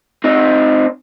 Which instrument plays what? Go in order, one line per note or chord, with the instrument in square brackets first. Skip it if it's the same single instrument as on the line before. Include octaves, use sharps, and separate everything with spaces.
[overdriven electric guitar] C4 D#4